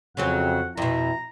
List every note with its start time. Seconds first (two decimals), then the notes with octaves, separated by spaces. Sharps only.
0.17 F2 C#3 F#3 C4 F#5
0.77 F2 B2 E4 A#5